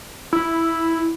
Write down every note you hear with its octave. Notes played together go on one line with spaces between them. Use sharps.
E4